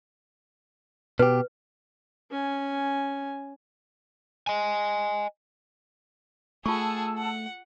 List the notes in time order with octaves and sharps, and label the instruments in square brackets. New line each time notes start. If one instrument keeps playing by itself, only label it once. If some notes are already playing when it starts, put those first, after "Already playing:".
[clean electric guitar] B2 G4 [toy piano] B4
[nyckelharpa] C#4 G#5
[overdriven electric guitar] D#5 G#5
[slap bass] A3 [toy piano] F4 C#6 [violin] G#4 F#5 [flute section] A5 E6
[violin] F#5